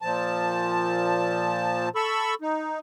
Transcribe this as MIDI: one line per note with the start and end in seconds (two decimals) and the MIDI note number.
0.02 1.89 46
0.02 1.89 53
0.02 1.89 81
1.96 2.34 69
1.96 2.34 83
1.96 2.34 85
1.96 2.34 88
2.42 2.79 63